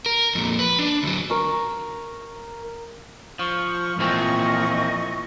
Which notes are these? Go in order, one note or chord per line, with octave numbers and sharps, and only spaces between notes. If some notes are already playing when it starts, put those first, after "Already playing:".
A#4
F2 A#2
B4
D4
D2 F#3
A#4 C#6
F3 C#6
A#2 E3 F3 C4 D#5 C#6